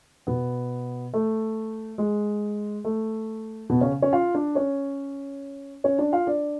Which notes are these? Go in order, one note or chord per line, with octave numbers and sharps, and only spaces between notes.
B2 B3
A3
G#3
A3
B2 B3
C#3 C#4
C#4 C#5
F4 F5
D4 D5
C#4 C#5
C#4 C#5
D4 D5
F4 F5
D4 D5